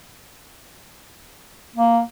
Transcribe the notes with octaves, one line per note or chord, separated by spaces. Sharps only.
A#3